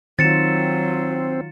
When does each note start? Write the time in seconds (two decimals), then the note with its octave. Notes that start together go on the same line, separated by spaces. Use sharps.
0.19 D#3 F#3 C4 F4 A6 C#7 E7